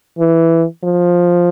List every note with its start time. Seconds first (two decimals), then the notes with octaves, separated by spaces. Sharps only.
0.19 E3
0.84 F3